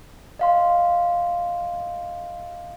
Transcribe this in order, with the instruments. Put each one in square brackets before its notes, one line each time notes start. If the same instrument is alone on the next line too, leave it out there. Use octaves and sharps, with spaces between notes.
[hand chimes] D#5 F5 C6